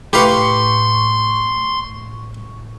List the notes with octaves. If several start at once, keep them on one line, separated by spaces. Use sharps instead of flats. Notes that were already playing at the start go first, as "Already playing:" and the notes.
A2 G4 B4 F5 C6 C#6